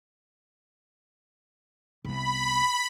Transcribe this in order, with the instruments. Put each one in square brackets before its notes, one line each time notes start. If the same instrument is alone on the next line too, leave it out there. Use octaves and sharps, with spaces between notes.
[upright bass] C2 B3 [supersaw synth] B5